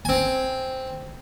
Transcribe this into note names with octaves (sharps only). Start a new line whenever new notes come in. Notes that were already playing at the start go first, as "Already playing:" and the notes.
C4 G#5